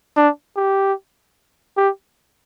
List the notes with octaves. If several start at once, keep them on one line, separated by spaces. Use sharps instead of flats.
D4
G4
G4